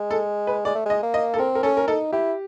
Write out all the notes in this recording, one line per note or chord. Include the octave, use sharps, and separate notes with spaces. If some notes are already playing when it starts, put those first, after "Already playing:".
Already playing: G#3
A4
B4
G#3 D5
A3
G#3 D#5
A#3
D#5
A4
C4 A#4
A#4
C#4 A4
A#4
D#4 A4
E4 G4